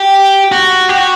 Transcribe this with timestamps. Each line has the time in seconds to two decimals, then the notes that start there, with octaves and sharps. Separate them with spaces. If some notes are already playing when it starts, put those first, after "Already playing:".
Already playing: G4
0.52 F#4
0.89 G4
0.97 F#4